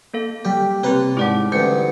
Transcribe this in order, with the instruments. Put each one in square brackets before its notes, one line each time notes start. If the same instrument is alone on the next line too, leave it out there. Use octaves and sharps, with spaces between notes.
[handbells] A#3 A4 F5
[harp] G3 [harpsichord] G4
[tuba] C3 [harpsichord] A#3 B4 [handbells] G4 C#5
[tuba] G#2 [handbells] E4 D5 F#5 [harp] D6
[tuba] A1 [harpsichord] D2 G2 [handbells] G6 [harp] C#7